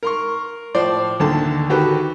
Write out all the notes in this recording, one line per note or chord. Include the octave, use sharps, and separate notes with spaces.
A#4 C6 C#6
A2 F3 C5 D5
D2 D3 D#3 A#3 A5
D#3 F#4 G4 A4 B4